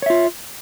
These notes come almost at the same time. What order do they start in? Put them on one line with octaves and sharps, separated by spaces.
C#5 E5 F4